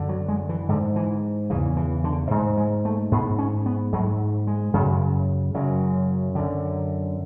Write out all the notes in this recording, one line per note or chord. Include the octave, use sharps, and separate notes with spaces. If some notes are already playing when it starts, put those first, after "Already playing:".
Already playing: F#2 D3
F#3
G#3
E3
G#2 D3
E3
E2 C#3 E3
E3
D3
G#2
G#3
A3
G#2 B3
C#4
B3
G#2 F#3
G#3
F#2 C#3
F#2 C#3 F#3
F#2 D3